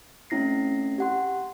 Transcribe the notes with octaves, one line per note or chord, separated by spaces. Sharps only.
A3 C4 C#4 E4 A#6 C7
G4 F#5 C6